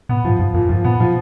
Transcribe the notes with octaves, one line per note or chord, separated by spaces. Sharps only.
A#2 B3
G#2 F3
F#2 F3
F2 A#2
F#2 F3
A#2 B3
F3